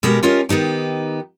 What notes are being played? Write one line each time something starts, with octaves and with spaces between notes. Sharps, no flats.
B2 G#3 F#4 G4 A#4
C#4 F4 G4 A#4 D#5
D#3 B3 D#4 G4